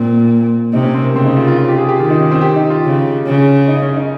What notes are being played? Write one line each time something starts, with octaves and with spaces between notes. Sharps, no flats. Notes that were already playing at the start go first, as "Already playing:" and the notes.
Already playing: A#2 C4
C3 D#4
C#4
C4
A#3
C#3 C4
D#4
F4
F4
F4
G4
G#4
G4
D#3 F4
D#4
C#4
C4
G4
D#4
F4
C#3
C#3
D#4
C#4
D#4